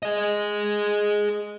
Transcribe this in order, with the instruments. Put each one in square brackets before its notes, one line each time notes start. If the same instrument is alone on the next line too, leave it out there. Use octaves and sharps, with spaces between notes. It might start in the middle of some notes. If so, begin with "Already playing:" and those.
[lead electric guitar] G#4 D#5